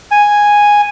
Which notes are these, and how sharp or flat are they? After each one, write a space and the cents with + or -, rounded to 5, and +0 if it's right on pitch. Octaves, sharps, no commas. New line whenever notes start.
G#5 -5